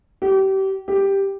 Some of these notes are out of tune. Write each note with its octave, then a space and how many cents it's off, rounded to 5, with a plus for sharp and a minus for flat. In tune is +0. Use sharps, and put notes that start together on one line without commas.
G4 -30
G4 +5